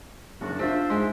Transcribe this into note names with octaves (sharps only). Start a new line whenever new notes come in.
F#1 G#2 D4 F#4
D4 F4 C5 E5
G#2 G#3 C6